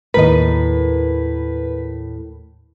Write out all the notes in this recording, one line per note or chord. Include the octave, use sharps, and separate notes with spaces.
D#2 A2 A#4 B4 D#5